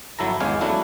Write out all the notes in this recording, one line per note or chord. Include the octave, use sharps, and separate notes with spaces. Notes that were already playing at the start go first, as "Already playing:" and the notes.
G1 F#3 E4 A4 A#5
G#1 E2 G#3 C#4 F5 G#5
F#3 A3 D4 E4 F#4